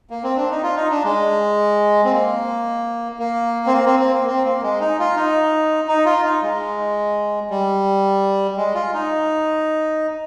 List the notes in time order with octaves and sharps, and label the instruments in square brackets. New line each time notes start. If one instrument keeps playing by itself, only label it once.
[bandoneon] A#3
C4
D4
D#4
F4
D#4
D4
G#3
C4
A#3
A#3
C4
A#3
C4
C4
A#3
C4
A#3
G#3
D#4
F4
D#4
D#4
F4
D#4
G#3
G3
G#3
F4
D#4